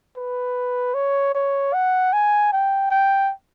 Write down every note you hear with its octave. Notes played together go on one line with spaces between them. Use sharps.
B4
C#5
C#5
F#5
G#5
G5
G5